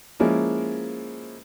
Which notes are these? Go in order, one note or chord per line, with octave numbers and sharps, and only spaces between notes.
F3 G#3 A#3 C#4 E4